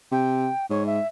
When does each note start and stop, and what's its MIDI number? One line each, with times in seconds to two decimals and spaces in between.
0.12 0.48 48
0.12 0.66 79
0.70 0.99 44
0.70 0.86 73
0.86 1.07 76